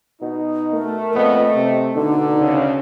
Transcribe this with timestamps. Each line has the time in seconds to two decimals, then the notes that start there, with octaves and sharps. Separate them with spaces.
0.21 B2 D#4
0.73 A3 A#4
1.15 F2 A#2 B3 D#5
1.55 C3
1.94 B2 D3 D#4
2.38 D2 C#3